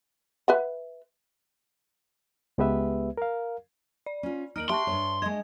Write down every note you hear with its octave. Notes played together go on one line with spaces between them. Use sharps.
B4 E5 F#5
C#2 G#3 B3 G4 B4 E5
A#4 F5
D5
C#4 F4
D#2 D#4 F6 D7 F#7
G4 E5 G5 A5 C6 C#6
G2 A#2 C#5
G#3 D#5 G#6